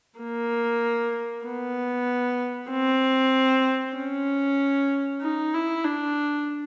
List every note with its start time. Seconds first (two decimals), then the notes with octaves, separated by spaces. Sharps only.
0.19 A#3
1.45 B3
2.70 C4
3.96 C#4
5.21 D#4
5.54 E4
5.84 D4